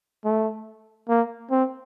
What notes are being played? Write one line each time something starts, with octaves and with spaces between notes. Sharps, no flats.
A3
A#3
C4